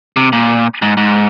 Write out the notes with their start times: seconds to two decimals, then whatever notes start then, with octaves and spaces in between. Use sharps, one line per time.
0.17 C3
0.33 A#2
0.82 G#2
0.97 G#2